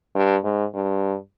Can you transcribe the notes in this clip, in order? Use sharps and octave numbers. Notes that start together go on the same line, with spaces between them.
G2
G#2
G2